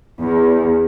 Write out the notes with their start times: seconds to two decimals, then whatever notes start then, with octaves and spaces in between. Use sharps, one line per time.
0.19 E2